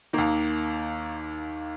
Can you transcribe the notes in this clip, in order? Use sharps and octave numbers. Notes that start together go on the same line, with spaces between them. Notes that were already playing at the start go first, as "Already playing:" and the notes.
D#2 D#3 A#3